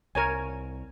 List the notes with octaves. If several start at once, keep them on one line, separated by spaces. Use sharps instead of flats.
C2 A#4 C#5 G#5